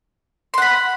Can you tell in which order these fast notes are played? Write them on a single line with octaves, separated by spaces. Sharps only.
C6 F#5 B5